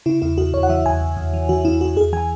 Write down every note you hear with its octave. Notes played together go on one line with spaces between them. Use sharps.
C#3 E4
E2 E4
E2 F#4
E2 C#5
F#5
E3 E5
E2 G#5
E2
E2
E3
E3 F#4
E2 E4
E2 F#4
E2 G#4
E3 G#5